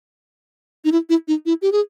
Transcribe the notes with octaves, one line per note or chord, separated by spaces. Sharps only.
D#4
E4
E4
D#4
E4
G4
G#4